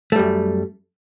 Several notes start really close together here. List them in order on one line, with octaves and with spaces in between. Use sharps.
A3 G3 F#2